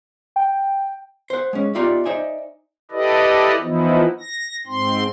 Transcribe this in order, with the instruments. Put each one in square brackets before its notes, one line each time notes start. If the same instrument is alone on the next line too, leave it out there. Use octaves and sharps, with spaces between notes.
[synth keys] G5
[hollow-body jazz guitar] C5 F#5
G#3 C#4
B3 D#4 F4 G4 D5 E5
D#4 C5 D5 E5 G#5
[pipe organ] E4 G4 A4 B4 D5 D#5
E3 F3 B3 D#4 E4
A#6
G#2 C4 C6